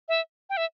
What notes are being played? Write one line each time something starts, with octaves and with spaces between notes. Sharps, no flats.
E5
G5
E5